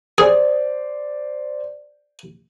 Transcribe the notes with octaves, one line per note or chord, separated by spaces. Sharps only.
G#4 C5 D5